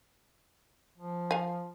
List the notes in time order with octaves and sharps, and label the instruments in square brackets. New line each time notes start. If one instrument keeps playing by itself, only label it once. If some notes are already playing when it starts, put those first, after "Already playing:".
[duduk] F3
[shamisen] F5 G#5